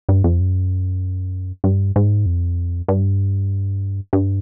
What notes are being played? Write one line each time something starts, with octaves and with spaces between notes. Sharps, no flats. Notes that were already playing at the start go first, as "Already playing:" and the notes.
G2
F2
F#2
G2
G#2
F2
G2
G2